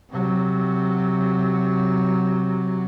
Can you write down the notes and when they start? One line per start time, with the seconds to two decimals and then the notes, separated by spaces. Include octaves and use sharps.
0.11 C3 F#3